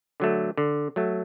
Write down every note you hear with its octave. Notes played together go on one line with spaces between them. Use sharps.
D3 F#3 A3
D3
F#3 A3